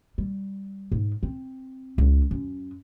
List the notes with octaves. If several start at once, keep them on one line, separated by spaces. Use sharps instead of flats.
G3
G#2
C4
C#2
F#2